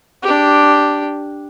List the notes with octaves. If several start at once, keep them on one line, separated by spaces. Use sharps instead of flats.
D4 G4